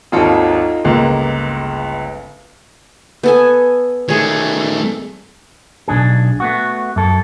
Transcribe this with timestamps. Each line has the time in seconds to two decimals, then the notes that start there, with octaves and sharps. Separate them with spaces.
0.12 G#1 D#2 D#4 F4 A4
0.85 G1 C#2 G#3 A#3
3.23 B3 A4 G#5
4.09 D#3 A3 G#4 C#5
5.88 B1 F#2 D4 G#4
6.40 A3 B3 F#4
6.96 F#2 A4